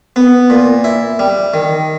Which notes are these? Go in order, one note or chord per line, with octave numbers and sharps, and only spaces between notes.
B3
A#2
E4
G3
D#3